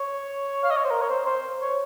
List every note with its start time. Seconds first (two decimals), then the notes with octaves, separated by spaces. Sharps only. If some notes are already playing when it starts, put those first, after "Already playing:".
Already playing: C#5
0.63 F5
0.71 D#5
0.77 C#5
0.84 C5
0.91 A#4
1.01 C#5
1.09 C5
1.26 C5
1.61 C#5